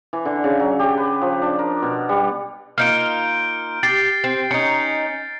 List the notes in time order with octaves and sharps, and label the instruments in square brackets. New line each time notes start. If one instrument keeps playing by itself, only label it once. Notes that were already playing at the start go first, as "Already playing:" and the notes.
[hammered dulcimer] E3
D3
C#3
F#3
G4
B4
F3
D4
A#4
B2
G3
[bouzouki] A#3 D#4 F4 [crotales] F6 G6 D7
[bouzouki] G4 [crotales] A6 C7
[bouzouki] C4
C#4 D#4